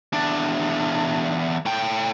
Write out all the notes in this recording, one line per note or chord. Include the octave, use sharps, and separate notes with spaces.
E2 D4
A2 G5